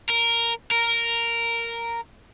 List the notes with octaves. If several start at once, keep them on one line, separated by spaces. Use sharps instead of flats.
A#4
A#4